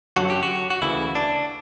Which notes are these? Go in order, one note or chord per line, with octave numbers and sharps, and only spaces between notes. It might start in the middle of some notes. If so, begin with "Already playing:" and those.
F#2 D3 F#3 F#4
G4
F#4
F#4
D2 C#3 E3 E4
D4